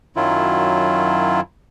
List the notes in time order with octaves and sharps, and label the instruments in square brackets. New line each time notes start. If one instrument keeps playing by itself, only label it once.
[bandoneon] F#2 D#3 F#3 E4 F4